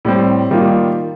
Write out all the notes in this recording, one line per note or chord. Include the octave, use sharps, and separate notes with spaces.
A2 G3 C4
D#3 G3 A#3 F4